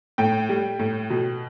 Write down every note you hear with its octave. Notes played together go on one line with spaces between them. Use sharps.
A2 G5
G3
A2
B2